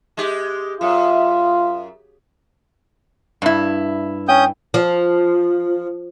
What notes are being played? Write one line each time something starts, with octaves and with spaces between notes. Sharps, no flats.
G#3 G4
F#2 F4
G2 E4
C#4 G5 D#6 G6
F3